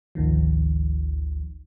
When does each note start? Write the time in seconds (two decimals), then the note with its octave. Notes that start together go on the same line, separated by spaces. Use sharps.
0.15 G#1 D2 D#3 F3